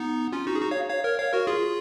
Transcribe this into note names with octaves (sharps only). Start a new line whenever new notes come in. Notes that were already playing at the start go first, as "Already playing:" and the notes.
Already playing: B3 D#4
C#4 F4
D#4 F#4
G#4
D#4 F#4
C#5 F5
C#5 F5
A#4 C#5
C#5 F5
F#4 A#4
F4 G#4